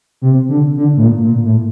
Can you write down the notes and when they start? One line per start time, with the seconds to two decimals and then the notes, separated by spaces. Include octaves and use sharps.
0.22 C3
0.49 D3
0.76 D3
0.97 A2
1.03 A#2
1.24 A#2
1.44 A2